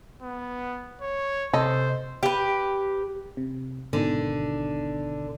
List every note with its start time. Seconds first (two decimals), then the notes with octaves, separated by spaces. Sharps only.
0.23 B3
1.01 C#5
1.53 C3 A4 C5 D#5
2.23 G4 B4
3.37 C3
3.93 G#1 B2 D3 D#3